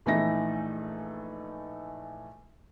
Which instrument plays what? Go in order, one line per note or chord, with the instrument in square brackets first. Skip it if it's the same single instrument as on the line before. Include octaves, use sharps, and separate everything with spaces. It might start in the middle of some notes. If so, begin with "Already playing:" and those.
[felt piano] A#1 E3 A3 D#4 A#6